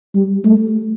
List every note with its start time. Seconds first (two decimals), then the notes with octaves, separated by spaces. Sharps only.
0.15 G3
0.45 A3